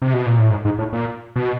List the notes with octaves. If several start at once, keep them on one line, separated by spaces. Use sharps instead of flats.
C3
B2
A#2
A2
G#2
G#2
A2
A#2
B2